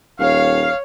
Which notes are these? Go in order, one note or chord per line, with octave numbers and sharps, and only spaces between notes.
D#1 C#5 F5